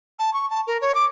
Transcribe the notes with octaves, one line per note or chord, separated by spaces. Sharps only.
A5
C#6
A5
A#4
C#5
D6